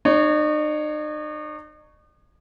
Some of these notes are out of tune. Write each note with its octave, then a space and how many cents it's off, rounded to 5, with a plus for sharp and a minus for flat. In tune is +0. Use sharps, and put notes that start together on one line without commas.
D#4 -45 C#5 +0